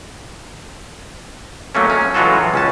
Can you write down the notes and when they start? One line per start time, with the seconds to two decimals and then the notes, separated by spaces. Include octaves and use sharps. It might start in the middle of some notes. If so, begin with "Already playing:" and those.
1.75 F#3 A3 A#3 C#4
1.87 G#3 C#4
2.14 E3 F#3 G#3 F4 F#4 A4
2.54 C#2 C#4 A5